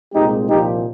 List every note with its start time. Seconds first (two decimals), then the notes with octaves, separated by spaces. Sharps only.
0.14 C2 A#2 G#3 C4 D#4 G4
0.49 C2 A#2 F3 A#3 D#4 G4